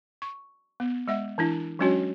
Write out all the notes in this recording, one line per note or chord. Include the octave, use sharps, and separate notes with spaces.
C#6
B3
G#3 E5 F#5
E3 D4 E4
F#3 G#3 C#4 D4 F#4 C#5